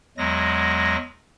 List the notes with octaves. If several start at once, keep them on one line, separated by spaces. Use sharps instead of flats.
E2 F#3 G#3 A#6